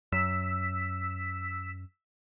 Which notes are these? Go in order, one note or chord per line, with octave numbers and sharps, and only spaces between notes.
F#2 E6 B6